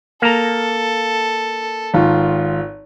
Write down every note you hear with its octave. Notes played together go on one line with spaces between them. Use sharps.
A#3 A4 A#5
G#1 F4